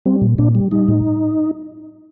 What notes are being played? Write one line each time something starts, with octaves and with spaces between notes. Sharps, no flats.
G3 C4
A#2
A#2 D4
G3
G3 D#4
A2